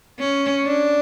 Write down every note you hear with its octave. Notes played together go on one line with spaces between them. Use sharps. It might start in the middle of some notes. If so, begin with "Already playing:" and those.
C#4
D4